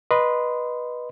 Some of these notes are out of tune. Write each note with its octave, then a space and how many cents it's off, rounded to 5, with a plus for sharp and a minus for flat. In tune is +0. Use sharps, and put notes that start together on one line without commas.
B4 -15 D#5 -10 C6 -20